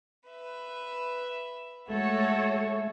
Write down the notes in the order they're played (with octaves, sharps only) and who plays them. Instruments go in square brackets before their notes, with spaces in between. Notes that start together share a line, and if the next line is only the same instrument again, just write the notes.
[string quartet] B4 E5
[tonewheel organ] G#3 E5 [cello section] A3 A4 C#5 [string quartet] F#4